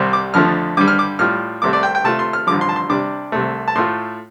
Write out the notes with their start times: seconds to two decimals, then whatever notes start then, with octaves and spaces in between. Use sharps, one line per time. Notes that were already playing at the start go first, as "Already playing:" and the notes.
Already playing: C2 C3 G3 C4
0.13 D6
0.34 F2 D3 F3 A3 F6
0.77 G2 D3 G3 D6
0.88 F6
0.99 D6
1.19 A2 G3 F4 F6
1.62 C2 C3 A3 D6
1.73 D5
1.83 G5
1.95 G5
2.04 C3 A3 F4 A5
2.19 C6
2.33 F6
2.47 A1 G2 D3 F3 D6
2.61 C6
2.69 A5
2.76 C6
2.90 C3 G3 D4 D6
3.32 C2 C3 A3
3.68 A5
3.75 A2 A3 F4 C6